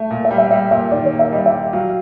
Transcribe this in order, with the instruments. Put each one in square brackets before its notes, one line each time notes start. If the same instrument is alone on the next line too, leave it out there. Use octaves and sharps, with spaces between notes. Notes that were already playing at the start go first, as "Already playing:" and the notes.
Already playing: [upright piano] A3
[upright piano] A#2 [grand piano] F5
[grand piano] E5
[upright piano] G3
[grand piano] E5
[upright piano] G3 [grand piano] E5
[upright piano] A#2 [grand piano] E5
[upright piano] D#3 [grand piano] D5
[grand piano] C#5
[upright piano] A#3
[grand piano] E5
[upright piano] G3 [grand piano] D#5
[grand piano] E5
[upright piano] G3
[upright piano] F#3 [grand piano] F5